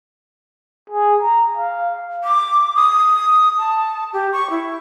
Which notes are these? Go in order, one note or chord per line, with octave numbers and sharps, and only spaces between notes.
G#4
A#5
F5
D6
D#6
A5
G4
C#6
E4